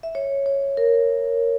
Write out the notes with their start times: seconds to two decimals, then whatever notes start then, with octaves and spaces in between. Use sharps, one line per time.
0.03 E5
0.15 C#5
0.46 C#5
0.77 A#4